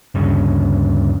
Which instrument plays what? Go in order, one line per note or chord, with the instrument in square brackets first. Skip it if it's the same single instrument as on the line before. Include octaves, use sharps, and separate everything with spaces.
[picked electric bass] D2 G2 C#3